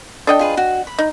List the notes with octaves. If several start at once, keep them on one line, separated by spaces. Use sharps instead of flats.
D4 A4 D#5 G5
F4 G#4 B4
F#4
B5
D#4